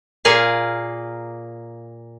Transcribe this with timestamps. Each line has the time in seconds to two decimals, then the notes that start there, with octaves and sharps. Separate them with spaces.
0.25 A#2 A#3 G#4 F5